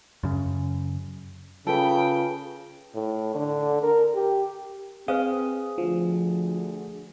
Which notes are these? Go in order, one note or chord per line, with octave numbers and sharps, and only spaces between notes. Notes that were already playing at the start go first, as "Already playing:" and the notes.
F#2 C#3
C#3 F4 A4 B4 G5
A2
D3
A#4
G4
C4 G#4 B4 C5 F5 D#6
D2 F3